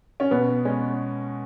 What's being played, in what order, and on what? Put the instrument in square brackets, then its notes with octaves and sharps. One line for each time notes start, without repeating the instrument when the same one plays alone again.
[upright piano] C#4
[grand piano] B2 [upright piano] B3
[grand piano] G#3 C#4